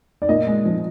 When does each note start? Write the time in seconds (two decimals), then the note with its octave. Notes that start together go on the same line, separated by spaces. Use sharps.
0.22 D5
0.29 A#2 D#5
0.47 G#3
0.65 F3